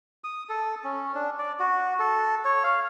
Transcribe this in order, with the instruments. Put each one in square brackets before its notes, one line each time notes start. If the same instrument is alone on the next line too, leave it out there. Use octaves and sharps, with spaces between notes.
[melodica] D#6
A4
C#4
D4
D5
F#4
A4
C#5
F5